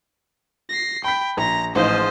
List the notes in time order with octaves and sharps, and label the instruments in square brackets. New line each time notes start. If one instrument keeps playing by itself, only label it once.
[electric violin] A#6 C7
[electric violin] G5 [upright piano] B5 B6
[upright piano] A#1 [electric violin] A#5 A#6
[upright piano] A1 [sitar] G#2 F3 [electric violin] C5 D#5